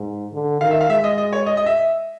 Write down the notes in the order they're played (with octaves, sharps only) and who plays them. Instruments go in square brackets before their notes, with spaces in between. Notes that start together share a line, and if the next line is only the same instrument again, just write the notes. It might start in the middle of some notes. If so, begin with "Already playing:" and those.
Already playing: [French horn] G#2
D3
[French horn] D#3 [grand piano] F5
[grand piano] E5
F5
[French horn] G#3 [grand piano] E5
[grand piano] D#5
D#5
C#5
D#5
D#5
E5